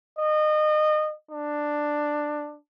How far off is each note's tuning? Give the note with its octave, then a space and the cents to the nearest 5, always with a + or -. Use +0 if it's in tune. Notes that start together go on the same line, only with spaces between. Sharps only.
D#5 -25
D4 +10